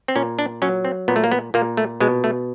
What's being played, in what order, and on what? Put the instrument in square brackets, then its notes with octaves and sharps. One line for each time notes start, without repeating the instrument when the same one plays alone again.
[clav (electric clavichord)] C4
A#2 C#4
D4
F#3 C#4
C4
A#2 B3
A3
A#3
B3
A#2 A#3
A3
B2 G#3
A3